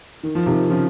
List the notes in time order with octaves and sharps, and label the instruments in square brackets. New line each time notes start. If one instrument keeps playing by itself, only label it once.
[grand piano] D#3
F3
C3 D#3
C#3 F3